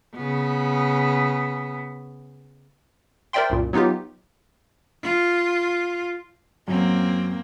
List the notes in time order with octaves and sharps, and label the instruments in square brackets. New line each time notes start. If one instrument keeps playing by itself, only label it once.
[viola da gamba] C#3 B3
[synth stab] A#4 C5 D5 E5 G5 C6
C2 F#2 A#2
F#3 B3 D#4 F4 G4
[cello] F4
[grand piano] F#2 [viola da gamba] A#3 C4